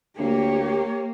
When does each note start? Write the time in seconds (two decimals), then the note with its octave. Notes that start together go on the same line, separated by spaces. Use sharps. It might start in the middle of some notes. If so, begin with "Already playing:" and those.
0.19 D2 A#3 G4 C#5